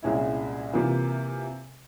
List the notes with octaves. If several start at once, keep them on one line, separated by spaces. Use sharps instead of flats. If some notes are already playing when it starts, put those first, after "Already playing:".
C2 A#2 G#3 C#4 E4
C3 E3 A#3 F4